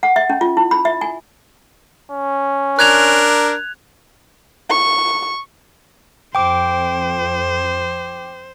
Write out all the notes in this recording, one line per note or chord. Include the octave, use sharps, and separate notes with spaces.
F#5
E5
C#4
F4
E4
B5
E5
G#5
C#4
D4 A#4 F#6 G#6 F7
C#6
F2 C5 G5 D6